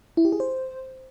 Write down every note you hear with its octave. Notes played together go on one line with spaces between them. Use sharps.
E4
G4
G#4
C5